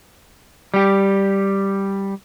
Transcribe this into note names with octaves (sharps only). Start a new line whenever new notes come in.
G3 G4